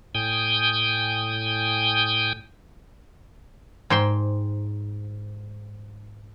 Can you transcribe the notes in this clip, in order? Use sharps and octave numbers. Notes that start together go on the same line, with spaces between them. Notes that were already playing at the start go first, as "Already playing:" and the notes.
A2 G5 G#5 D#6 G6
G#2 C5 G5 C6